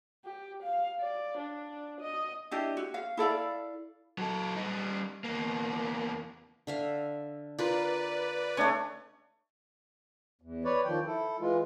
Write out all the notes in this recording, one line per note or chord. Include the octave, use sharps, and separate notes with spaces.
G4
F5
D5
D4
D#5
D4 E4 G4 D#5
F#4
F5
E4 A4 D5 F5
F#3 A4
G3 D#4
E2 A#3
D3 E5 F5
F4 A#4 B4 D5
A3 C#4 D4 C#5 D#5
E2
B4 C#5 D5
D#3 F3 G5
E4 A4
E3 G#3 F4